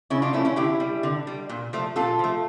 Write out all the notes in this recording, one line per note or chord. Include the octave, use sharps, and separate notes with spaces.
C#3 C#4 E4
D4 F4
F3 A3 C#4 E4
C#4 E4
D3 E4 G4
G3
D3
G3
A#2
F3 A3
A#2 F4 A4
F3 A3